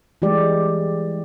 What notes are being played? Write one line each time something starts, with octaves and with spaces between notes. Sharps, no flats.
E3 G3 G#3 G4 D5